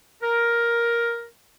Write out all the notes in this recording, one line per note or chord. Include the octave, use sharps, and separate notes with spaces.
A#4